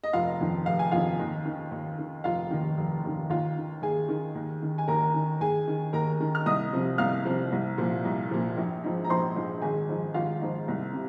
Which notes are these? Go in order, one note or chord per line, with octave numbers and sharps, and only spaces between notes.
D#5
F1 F4 F5
F2 D#3
F1 F5
G#5
F2 D#3 F4 F5
D#2
D#3
D#2
D#3
F1 F4 F5
D#2 D#3
F1
D#2 D#3
D#2 F4 F5
D#3
D#2 G#4 G#5
D#3
D#2
D#3
G#5
D#2 A#4 A#5
D#3
D#2 G#4 G#5
D#3
D#2 A#4 A#5
D#3
F6
C2 D#5 D#6
C3 F3
C2 F5 F6
C3 F3
C2
A#2 F3
C2
A#2 F3
A#1
G#2 F3
A#5
A#1 C5 C6
G#2 F3
G#1 G#4 G#5
G#2 F3
G#1 F4 F5
G#2 F3
C2
C3